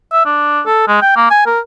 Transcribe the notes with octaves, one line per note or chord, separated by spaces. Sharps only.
E5
D4
A4
G#3
G5
A#3
G#5
A#4